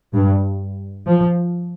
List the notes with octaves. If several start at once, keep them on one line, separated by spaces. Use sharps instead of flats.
G2
F3